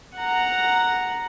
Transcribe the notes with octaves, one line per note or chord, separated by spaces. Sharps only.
F#5 A#5